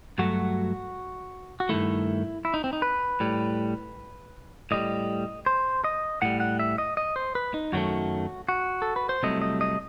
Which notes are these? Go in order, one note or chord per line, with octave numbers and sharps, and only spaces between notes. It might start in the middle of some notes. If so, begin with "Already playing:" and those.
G2 F#3 A3 F#4
F#4
G2 D#3 A3 E4
E4
D#4
C4
D#4
B4
A2 G3
A2 G3 D#5
C5
D#5
A2 G3 F#5
F#5
E5
D#5
D#5
C5
B4
D#4
F#2 D#3 F#3 A3 F#4
F#4
A4
B4
C5
C2 C3 F#3 A3 D#5
D#5
D#5